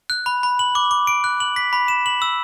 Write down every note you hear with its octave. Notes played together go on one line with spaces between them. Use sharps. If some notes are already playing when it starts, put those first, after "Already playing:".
F#6
B5
B5
F#7
D6
D6
D7
F#6
F#7
B6
B5
E7
F#7
E6